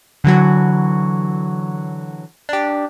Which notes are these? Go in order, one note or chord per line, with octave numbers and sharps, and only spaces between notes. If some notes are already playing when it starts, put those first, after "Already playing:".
D3 E3 F#3 F#4
D4 G4